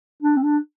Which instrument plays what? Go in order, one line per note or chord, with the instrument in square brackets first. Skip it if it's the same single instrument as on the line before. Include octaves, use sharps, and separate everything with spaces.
[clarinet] D4
C4
D4